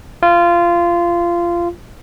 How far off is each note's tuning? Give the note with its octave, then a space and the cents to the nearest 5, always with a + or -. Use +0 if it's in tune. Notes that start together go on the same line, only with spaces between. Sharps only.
F4 -20